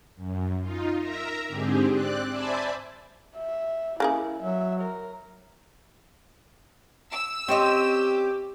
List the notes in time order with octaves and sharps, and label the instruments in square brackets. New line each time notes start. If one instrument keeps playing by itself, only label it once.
[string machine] F#2
D#4 F4
A#4 E5 A#5
G#2 D3 C4 G4 G#4
C4 D5 F#6
C5 D5 E5 G#5 A5 B5
[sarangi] E5
[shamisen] C#3 A#3 G#4 [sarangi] E4
[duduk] F#3 [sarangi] E5
[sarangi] A#4
[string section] E6
[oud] C4 C#4 D#5 [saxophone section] G4